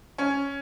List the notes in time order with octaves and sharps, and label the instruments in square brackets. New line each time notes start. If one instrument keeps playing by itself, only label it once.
[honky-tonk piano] C#4